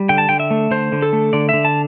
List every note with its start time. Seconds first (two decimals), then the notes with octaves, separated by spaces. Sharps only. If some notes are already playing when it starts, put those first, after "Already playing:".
Already playing: G3
0.09 D3 G5
0.18 A5
0.29 D3 G5
0.40 E5
0.51 A3
0.71 D3 C5
0.92 D3
1.02 A4
1.13 A3
1.33 D3 D5
1.49 D3 E5
1.65 A5